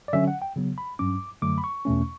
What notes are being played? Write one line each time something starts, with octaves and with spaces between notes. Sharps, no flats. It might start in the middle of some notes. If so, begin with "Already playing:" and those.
D5
D3 F#3 C#4 E5
F#5
G5
C#3 F#3 B3
B5
G2 F#3 C#4 D6
F#2 D3 F#3 A3 D6
B5
C#6
E2 B2 A3 C#4